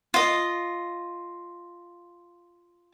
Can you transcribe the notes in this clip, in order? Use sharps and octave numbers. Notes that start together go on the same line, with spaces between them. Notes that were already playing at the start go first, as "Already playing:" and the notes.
F4 D#5